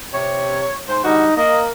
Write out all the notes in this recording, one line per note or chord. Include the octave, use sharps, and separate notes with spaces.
C3 C#5
G#2 C5
D3 G3 D#4 F#4
A#3 D#5